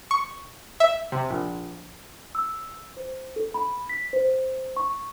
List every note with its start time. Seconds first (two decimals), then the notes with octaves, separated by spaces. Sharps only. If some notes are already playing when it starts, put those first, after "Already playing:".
0.11 C#6
0.80 E5
1.12 C3
1.30 A#1
2.35 E6
2.97 C5
3.36 A4
3.54 B5
3.89 B6
4.13 C5
4.77 C#6